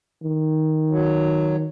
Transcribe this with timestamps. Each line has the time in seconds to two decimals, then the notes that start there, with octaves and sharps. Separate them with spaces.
0.23 D#3
0.90 F#3